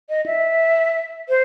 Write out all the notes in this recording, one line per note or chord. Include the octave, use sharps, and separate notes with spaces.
D#5
E5
C5